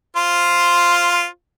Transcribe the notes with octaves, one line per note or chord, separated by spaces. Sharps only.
F4 C5